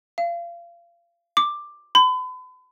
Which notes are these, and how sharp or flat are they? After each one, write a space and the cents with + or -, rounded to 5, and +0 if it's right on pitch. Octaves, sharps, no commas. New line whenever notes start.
F5 -30
D6 +10
B5 +40